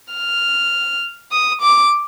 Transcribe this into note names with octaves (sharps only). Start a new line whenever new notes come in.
F6
D#6
D6